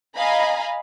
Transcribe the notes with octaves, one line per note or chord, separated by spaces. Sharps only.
D#5 F5 G#5 A#5 B5